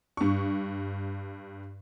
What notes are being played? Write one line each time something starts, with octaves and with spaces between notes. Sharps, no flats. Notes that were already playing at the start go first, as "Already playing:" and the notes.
G2 C#6